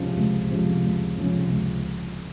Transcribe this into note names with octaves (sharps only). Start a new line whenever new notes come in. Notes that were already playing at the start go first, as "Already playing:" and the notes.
Already playing: C#2 C3 F3 G#3 C#4
C#2
C3 F3 G#3 C#4
C#2
C3 F3 G#3 C#4
C#2